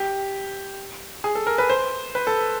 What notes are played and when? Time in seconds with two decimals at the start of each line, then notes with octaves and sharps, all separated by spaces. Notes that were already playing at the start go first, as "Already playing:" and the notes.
Already playing: G4
1.24 G#4
1.35 A4
1.47 A#4
1.58 B4
1.69 C5
2.15 B4
2.27 A4